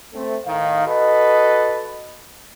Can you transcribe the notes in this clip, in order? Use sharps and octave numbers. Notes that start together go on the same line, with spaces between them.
A3 C4
A2 D#3 D#4 F5
F#4 A4 B4 D#5